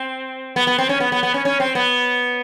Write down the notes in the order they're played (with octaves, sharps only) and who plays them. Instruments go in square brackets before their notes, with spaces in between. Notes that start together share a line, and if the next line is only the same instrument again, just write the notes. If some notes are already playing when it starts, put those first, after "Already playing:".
Already playing: [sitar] C4
B3
B3
C4
C#4
B3
B3
B3
C#4
C#4
C4
B3